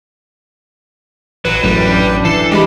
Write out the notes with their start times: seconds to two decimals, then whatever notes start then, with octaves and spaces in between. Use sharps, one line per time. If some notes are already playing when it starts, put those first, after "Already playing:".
1.45 A1 F#3 B4
1.63 F#2 A2 G3
1.81 D4
2.25 E3 A4 C7
2.52 C#2 G#3 G4 B5